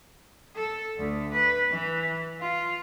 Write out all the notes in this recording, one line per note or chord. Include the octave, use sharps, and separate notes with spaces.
A4
D2
B4
E3
F4